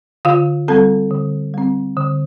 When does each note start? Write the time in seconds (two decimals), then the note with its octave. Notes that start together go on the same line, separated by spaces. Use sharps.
0.25 D3 F4 F5
0.68 G3 C4 A4 A5
1.11 D3
1.54 G3 C4
1.97 D3